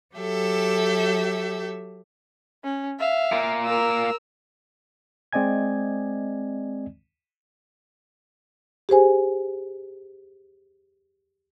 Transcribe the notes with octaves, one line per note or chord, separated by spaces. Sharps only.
F#3 G4 A4 E5
C#4
E5 F5
A#2 A#3
A#4 E6
G#3 C4 D5 D#5 G#5 G#6
G4 G#4 C5 G#5